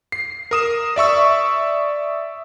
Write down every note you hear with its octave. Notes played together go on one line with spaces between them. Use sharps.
C7
A#4 D#6 E7
D5 E5 C#6 E6